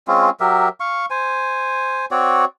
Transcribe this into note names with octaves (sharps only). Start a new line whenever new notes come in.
G#3 C4 C#4 F4
F#3 G4 A#4 E5
F5 C#6
C5 G#5
C4 F#4 C#5 D5